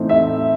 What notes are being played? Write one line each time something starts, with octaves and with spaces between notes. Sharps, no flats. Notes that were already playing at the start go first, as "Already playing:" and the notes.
Already playing: A2 E3 A3 C4 D#4
E5